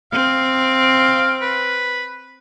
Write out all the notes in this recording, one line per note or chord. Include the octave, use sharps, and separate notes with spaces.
C4 F5
B4